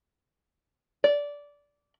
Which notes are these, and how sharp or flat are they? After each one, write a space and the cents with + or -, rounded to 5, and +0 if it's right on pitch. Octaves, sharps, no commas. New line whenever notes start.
D5 -15